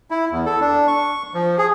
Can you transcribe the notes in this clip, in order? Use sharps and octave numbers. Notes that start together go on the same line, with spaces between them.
E4
E2
A4
D4
C#6
F3
G#4